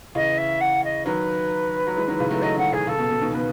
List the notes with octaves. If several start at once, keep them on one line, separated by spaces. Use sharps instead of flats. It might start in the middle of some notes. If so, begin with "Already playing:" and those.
C#3 E3 D#5
E5
F#5
D#5
D#3 F#3 B4
F#3
E3 G#3
D#3 F#3
C#3 E3
F#3 A3
F#3 A3 D#5
D#3 F#3 F#5
C#3 E3 G#4
C#3 A4
B2
B2
B2 D#3
B2 D#3 B4